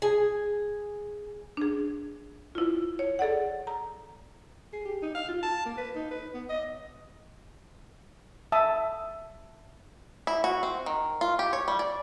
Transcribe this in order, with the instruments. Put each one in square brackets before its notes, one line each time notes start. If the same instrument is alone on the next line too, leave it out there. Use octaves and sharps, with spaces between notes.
[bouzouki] G#4 G#5
[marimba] D4 G#4
E4 F4
C#5
G#4 A4 D5 F#5
A#5
[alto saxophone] G#4
G4
D#4
F5
F4
A5
A#3
B4
D#4
B4
B3
D#5
[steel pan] E5 A5 D#6
[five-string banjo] E4
F#4
C4
D#3
F4
G4
C#5
G3
D5